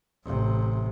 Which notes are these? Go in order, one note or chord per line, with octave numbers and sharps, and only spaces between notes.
A1 C3